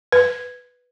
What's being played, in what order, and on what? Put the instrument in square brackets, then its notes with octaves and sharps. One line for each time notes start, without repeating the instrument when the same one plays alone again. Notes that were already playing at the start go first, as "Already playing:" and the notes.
[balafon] B4